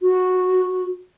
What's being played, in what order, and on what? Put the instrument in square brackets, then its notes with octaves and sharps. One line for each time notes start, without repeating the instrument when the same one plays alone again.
[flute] F#4